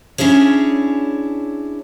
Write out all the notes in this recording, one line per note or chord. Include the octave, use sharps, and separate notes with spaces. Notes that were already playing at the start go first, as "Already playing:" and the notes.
C#4 D4 E4 G#4 C#5